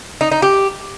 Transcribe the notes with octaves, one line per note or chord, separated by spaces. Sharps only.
D#4
D#4
G4